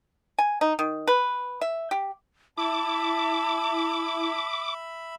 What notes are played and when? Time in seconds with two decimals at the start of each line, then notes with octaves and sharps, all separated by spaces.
0.38 G#5
0.61 D#4
0.79 D#3
1.07 B4
1.61 E5
1.91 G4
2.58 E4 E5 A5 B5 D6